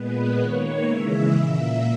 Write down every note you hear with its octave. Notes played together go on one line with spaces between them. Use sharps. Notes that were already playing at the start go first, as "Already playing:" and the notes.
Already playing: A#2 G#3 B3 B4
D#3 A#3 C#5
C#3 E3 G#3 E5
A#2 A#3 E5